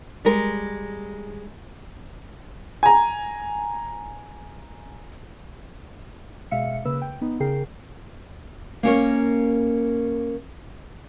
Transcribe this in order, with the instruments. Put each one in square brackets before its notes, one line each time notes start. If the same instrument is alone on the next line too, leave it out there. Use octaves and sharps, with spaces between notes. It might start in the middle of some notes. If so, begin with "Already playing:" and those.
[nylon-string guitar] G3 G#3 A#4
[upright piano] G#5 A#5
[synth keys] B2 G#3 E5 F5 C#7
C#3 A#3 B4 E6
G5
B3 D#4
C#3 G#4 A#4 G5 C7
[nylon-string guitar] A#3 C#4 A#4 C#5